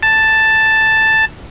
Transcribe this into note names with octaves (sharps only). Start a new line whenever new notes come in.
A5